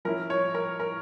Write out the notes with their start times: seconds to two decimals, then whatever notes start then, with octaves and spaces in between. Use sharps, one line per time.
0.05 F3 C#4 E4 A#4
0.30 C#5
0.55 A#4
0.80 A#4